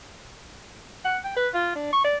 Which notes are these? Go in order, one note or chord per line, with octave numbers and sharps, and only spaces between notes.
F#5
G5
B4
F4
D4
C#6
D5